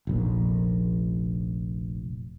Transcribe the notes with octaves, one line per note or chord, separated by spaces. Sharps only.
F1 A#1